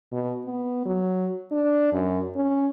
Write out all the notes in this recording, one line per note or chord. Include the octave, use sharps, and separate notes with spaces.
B2
B3
F#3
D4
F#2
C#4